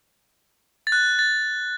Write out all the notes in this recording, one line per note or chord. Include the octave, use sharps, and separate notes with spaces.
A6
F#6
A6